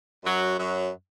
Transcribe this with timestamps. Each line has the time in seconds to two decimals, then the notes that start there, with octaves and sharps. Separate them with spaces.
0.24 F#2 F#3
0.59 F#2 F#3